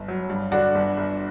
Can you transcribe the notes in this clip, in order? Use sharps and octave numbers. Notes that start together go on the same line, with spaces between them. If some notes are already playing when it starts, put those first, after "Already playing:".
Already playing: G1
F#3
G2
D3 D4 F#4
G1
G1